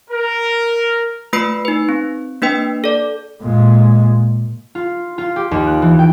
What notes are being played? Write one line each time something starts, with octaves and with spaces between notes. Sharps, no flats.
A#4
A3 F4 B4 B5 C7
D#4 B4
C4
A#3 D4 B4 G5
A4 D5
A#2 G#3
F4
F4
G4
D#2
F#6
E3
G5